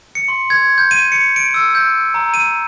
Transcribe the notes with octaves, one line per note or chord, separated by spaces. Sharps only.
C#7
C6
G#6
G6
D#7
C#7
D7
E6
G6
A#5
D#7